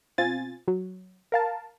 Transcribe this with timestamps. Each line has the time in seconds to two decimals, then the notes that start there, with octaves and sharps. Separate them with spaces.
0.18 B2 C4 F4 G#5 A6
0.68 F#3
1.32 A#4 F5 A5